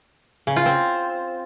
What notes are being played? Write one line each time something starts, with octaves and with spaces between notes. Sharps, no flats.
C#3
F4
C4